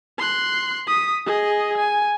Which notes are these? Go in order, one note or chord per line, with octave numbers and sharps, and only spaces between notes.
C6 F#6
D#6 B6
G#4 D#5
G#5